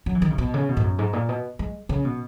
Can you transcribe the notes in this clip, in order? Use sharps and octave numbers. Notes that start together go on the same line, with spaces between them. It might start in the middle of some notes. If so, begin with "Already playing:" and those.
F#3
E3
D#3
C#3
B2
C#3
B2
G#2
F#2
G#2
A#2
B2
G#3
C#3
B2